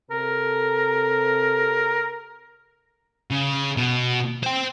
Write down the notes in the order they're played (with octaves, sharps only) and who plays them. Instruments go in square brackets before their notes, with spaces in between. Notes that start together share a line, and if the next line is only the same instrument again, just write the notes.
[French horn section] C3 A4 [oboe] A#4
[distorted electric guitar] C#3
B2
C5 G5